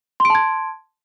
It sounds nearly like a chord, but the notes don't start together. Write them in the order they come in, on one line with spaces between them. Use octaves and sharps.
C6 D7 A5 G#6